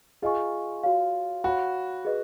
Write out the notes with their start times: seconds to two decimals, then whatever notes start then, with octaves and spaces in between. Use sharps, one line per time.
0.22 F4 G#4 D#5 G#5 C#6
0.83 F#4 C#5 F5
1.44 F#4 C#5 F5 B5
2.05 G#4 B4 D#5